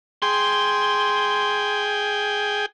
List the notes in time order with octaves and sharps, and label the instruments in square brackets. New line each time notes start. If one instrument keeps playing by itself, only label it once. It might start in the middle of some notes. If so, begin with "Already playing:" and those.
[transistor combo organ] G#4 G5 [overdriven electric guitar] C6